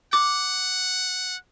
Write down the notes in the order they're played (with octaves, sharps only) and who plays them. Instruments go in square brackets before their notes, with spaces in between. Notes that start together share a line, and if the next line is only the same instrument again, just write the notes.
[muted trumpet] F#5 [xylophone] D6